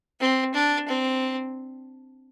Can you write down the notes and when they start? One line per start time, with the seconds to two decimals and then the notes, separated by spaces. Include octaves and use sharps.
0.20 C4
0.54 D4
0.88 C4